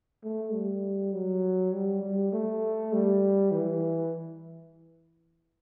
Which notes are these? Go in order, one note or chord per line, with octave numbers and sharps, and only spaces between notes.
A3
G3
F#3
G3
G3
A3
G3
E3